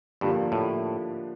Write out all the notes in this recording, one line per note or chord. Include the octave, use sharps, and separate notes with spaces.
G2 D3 F3 A#3 D4 G4
A2